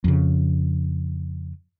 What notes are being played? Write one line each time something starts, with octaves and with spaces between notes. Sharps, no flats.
F2 C#3